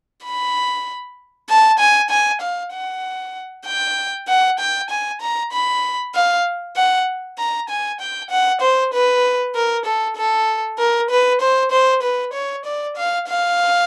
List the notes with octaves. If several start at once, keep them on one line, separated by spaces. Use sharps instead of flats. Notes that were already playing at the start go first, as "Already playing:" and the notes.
B5
A5
G#5
G#5
F5
F#5
G5
F#5
G5
G#5
A#5
B5
F5
F#5
A#5
G#5
G5
F#5
C5
B4
A#4
A4
A4
A#4
B4
C5
C5
B4
C#5
D5
F5
F5